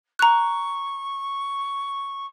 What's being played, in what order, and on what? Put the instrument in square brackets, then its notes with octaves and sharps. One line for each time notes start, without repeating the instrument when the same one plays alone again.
[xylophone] A#5 F#6 [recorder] C#6